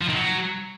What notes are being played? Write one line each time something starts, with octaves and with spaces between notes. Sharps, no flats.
F3
D#3
F#3